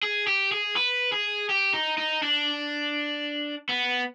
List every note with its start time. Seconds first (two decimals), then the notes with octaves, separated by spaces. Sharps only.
0.03 G#4
0.27 G4
0.52 G#4
0.76 B4
1.12 G#4
1.49 G4
1.73 D#4
1.98 D#4
2.23 D4
3.69 B3